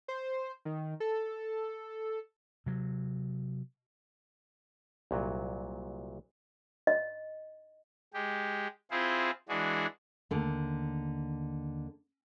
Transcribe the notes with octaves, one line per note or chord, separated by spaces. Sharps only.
C5
D#3
A4
C3 F#3
C2 A#2 F#3
D#5
G#3 G4
C4 E4 F4 G#4 C5
E3 G#3 D4 F#4 G#4
D#2 D3 A3